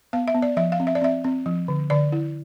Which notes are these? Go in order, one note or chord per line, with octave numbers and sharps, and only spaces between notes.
B3 F5
E5
B3
D5
F3 E5
F5
C4
E5
D5
C4 E5
C4
F3
D3
D3 D5
E4